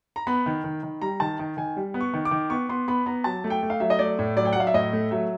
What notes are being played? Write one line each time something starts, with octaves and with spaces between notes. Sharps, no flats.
A#5
B3 B5
D#3
D#3
D#3
G3 A#5
D#3 A5
D#3
D#3 G#5
G3
B3
C#6
D#3
D6
D#3
B3 C#6
B3 C6
B3 B5
B3 A#5
F#3 A5
A3
G5
A3
F5
F#3 E5
D#5
A3 D5
A2
F#3 D5
G5
F#5
F#3 F5
E5
A2 D#5
A3
F#3 E5